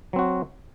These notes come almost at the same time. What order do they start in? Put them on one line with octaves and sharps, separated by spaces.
F#3 C4 F#4